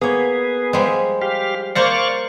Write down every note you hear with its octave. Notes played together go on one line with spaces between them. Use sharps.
A#3 B3 G#4 C#5
F3 G3 G#3
G4 F5
A#3 C5 D5 F5 A#5 C#6